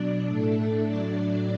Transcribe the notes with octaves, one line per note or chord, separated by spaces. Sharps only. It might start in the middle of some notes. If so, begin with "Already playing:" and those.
Already playing: B2 F#3 D4 D5
A2 A3 D4 A4
A2 F#3 D4 D5